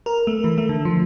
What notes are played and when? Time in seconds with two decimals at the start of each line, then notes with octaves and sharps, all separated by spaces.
0.06 A#4
0.27 A3
0.44 E3
0.58 A3
0.69 D3
0.85 F3